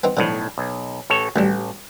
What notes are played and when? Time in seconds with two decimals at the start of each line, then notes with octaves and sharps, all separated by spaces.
0.04 B3 C4 D#4
0.17 B1 A2 D3 F3
0.58 B1
1.10 A1 A4 C#5
1.36 A1 D2 G3